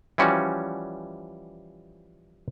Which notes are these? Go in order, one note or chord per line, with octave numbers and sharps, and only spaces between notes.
E3 F3 G3 C#4 F#4